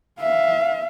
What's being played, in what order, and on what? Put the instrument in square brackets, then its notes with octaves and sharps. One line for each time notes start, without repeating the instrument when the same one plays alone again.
[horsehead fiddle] E5 F5